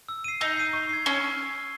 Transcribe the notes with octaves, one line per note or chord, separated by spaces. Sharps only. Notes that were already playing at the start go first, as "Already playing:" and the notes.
E6
C7 D#7
D#4 E6
C7 D#7
C#6
G#6 C7
C#4 C#6